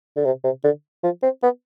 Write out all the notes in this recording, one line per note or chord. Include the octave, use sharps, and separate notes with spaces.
D3
C3
C3
D3
F3
C4
B3